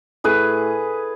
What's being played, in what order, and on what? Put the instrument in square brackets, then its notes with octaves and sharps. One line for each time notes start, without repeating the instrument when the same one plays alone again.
[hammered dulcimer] A2 G#4 B4